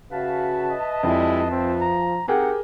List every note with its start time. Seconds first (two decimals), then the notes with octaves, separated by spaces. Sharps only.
0.12 C#3 F#4 B4 E5 F5 A5
0.70 D#5
1.03 F2 G3 G#3 E4
1.51 F3 C4
1.81 A#5
2.28 C4 D#4 G4 G#4 A#4 F#5 G5